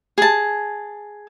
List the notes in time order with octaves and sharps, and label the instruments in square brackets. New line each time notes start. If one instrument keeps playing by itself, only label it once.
[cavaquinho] G#4 A5